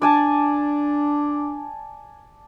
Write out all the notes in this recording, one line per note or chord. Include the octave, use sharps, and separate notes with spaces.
D4 D5 G#5 A5